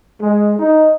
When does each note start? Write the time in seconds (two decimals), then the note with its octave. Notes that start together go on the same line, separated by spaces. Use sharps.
0.21 G#3
0.59 D#4